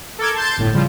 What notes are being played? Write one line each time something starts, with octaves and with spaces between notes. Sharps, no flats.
A4 A#4 D6 G#6
A5 C6 G6 A6
G1 A2
C#3 F3 G3